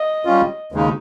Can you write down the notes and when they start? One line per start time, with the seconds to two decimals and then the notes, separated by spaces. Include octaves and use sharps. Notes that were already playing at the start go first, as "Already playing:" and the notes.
Already playing: D#5
0.25 G3 C#4 F4
0.72 D#2 C#3 G#3 D#4